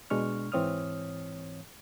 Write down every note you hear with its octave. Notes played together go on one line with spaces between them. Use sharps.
B2 G#3 D4 C#6 F6
G#2 E3 C4 C#5 D#6 F6